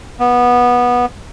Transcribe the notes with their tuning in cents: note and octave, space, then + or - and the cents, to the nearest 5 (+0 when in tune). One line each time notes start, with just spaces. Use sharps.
B3 -15